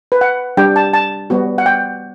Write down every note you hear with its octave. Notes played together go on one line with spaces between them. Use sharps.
B4
F#5
G3 D4 G4 G5
A5
A5
G3 B3 F#4
F#5
G5